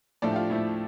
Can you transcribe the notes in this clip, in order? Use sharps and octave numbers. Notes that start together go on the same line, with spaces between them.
A2 F3 A3 D4 D5
G4
F4
A2 F3 A3 E4